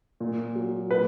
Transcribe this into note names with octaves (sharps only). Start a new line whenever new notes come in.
A#2
F#3
A#2 B4